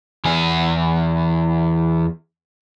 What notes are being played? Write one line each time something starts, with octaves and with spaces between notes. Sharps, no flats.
E2 G#4